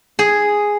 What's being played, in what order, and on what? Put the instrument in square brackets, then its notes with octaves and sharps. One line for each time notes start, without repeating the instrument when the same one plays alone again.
[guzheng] G#4